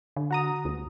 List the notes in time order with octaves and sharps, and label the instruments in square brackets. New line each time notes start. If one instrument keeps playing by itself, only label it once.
[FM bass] D3
[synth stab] F#4 A#5 D#6
[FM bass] D2